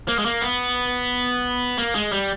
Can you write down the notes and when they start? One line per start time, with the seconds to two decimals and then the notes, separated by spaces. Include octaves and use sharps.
0.08 A#3
0.19 G#3
0.25 A#3
0.42 B3
1.78 A#3
1.95 G#3
2.12 G3